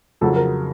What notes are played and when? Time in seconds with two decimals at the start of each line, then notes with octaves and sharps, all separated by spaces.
0.21 F2 C#3 F#3 A4
0.36 A#4